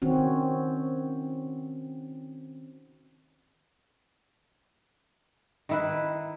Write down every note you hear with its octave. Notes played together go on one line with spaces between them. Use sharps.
D#3 C4 C#4 F#4
D#3 E4 B4